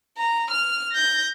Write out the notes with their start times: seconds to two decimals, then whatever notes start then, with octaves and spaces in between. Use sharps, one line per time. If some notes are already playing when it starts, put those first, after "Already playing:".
0.17 A#5
0.50 F6
0.92 G6 A#6